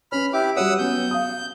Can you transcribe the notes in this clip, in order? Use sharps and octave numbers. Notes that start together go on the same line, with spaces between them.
C#4 B4 B5 F6
E4 G4 D6
G3 F#4 C#5 F#5 D#6 E6
F#3 B3 C#4 G6
F5 D#6